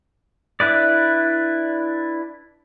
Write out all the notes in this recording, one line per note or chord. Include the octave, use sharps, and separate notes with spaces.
D4 E4 B4 D5